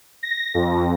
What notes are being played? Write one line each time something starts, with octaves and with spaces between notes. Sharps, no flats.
A#6
F2